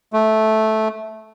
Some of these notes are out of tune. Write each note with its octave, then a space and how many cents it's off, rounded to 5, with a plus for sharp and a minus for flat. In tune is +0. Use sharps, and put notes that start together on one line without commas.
A3 -10